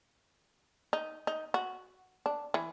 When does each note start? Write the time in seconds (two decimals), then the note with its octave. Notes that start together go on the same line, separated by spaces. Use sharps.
0.93 D#4
1.27 D#4
1.54 F#4
2.26 D4
2.54 E3